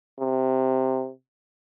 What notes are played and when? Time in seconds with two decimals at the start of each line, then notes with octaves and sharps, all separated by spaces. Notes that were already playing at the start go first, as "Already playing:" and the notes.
0.19 C3